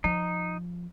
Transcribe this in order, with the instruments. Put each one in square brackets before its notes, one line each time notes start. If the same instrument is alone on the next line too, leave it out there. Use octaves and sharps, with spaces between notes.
[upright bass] F3 [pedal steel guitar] D#4